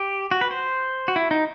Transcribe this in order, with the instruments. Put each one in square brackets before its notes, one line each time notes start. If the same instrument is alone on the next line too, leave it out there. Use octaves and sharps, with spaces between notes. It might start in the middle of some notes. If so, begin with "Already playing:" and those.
Already playing: [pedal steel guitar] G4
F#4
B4
C5
F#4
E4
D#4